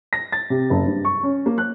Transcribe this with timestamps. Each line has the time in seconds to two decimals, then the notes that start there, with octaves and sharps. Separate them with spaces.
0.13 A#6
0.32 A6
0.50 C3
0.70 F#1
0.87 G2
1.05 C#6
1.23 C#4
1.46 A#3
1.58 F#6